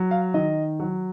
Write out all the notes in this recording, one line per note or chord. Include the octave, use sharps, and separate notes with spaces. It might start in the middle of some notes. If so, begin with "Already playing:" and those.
Already playing: F#3
F5
D#3 D#5
F#3